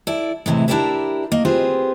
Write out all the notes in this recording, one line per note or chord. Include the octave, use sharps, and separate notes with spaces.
E4 A4 D5
A2 C3 E3 G#3
D4 E4 G4 A#4 D5 E5
A#3 D#5
C4 F4 G4 G#4 B4 C5